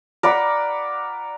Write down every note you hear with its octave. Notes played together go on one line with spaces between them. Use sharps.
A#4 D5 F#5 B5